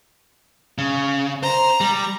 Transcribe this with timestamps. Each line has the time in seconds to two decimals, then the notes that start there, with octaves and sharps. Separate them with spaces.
0.78 C#3
1.43 C5 A#5
1.81 G3